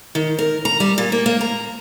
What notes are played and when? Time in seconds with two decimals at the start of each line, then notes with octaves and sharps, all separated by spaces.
0.15 D#3
0.39 A#4
0.65 A#5
0.80 G3
0.98 A#2
1.12 A#3
1.26 A#3
1.41 A#5